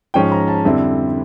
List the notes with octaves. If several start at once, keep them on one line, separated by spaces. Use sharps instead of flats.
G#2 F3 G#3 C#4 G5
A#5
A5
F2 D3 G3 C4 E4